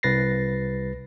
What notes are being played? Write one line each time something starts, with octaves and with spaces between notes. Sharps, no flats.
C2 B4 A6 A#6 C7